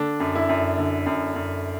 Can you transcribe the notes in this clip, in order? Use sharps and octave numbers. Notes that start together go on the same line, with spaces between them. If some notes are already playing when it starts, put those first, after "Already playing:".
Already playing: D3 D4
F#2
E4
F#2
D3
F#2
F#2